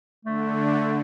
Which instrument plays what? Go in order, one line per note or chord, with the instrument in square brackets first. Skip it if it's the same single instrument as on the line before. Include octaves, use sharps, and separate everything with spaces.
[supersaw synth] D3 [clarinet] A3